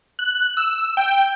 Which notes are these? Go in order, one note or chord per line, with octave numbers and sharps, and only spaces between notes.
F#6
E6
G5